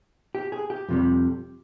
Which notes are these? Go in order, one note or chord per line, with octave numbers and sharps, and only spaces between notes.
G4
G#4
G4
F2 C3 G3